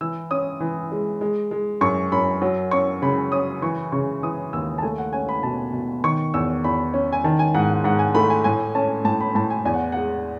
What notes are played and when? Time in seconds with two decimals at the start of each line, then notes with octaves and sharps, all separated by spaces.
0.01 E3 E6
0.31 C#4 D#6
0.60 E3
0.92 G#3
1.21 G#3
1.51 G#3
1.81 F#2 C#6
2.12 F#2 B5
2.42 F#3
2.71 C#4 C#6
3.02 C#3 B5
3.32 C#4 D#6
3.62 E3 C#6
3.92 C#3 C#6
4.23 E3 D#6
4.53 D#2 E6
4.78 A5
4.82 A3 G#5
4.98 F#5
5.13 C#4 G#5
5.29 B5
5.43 B2 A5
5.73 B2
6.04 D#3 C#6
6.34 E2 E6
6.64 E2 B5
6.94 C#4
7.12 G#5
7.24 D#3 A5
7.39 G#5
7.54 G#2 F#5
7.70 F#5
7.84 G#2 F#5
7.99 G#5
8.15 A3 B5
8.30 G#5
8.44 A2 G#5
8.75 C#4 A5
9.05 A2 A5
9.21 B5
9.35 A2 A5
9.50 G#5
9.65 E2 G#5
9.74 F#5
9.92 G#3 F#5